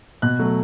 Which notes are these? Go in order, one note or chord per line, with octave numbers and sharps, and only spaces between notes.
B2 F#6
F#3 A3